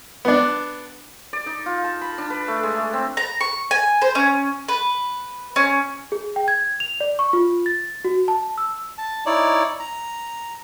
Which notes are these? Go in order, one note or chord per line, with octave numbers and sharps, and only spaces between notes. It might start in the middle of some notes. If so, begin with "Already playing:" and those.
B3 D4
D5
D#4
F4
A5
B5
D4
B4
A3
G#3
A3
C4
A#5
C#6
G#5
C5
C#4
B4
C#4
G#4
G5
G#6
F7
D5
C#6
F4
A6
F#4
A5
E6
A5
D#4 E4 C#5 D5
A#5